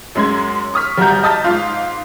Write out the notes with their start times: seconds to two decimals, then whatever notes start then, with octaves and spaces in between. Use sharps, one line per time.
0.15 F#2 G#3 C6 G#6
0.74 C#6 D#6 F6 B6
0.98 G#1 G3 F#4 E5 A#5 G6
1.23 D#5 A5 D#6 F6 A6 B6
1.44 G#2 F4